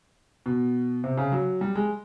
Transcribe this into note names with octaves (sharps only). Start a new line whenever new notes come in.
B2
C3
C#3
F#3
G3
G#3